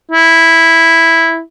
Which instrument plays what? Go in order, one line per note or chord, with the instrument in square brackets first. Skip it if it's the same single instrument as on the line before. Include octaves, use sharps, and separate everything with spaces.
[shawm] E4